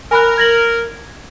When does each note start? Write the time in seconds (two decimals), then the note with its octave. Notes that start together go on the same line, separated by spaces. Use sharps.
0.11 A#4 G#5 B5 F#6
0.38 G#6 A#6 F#7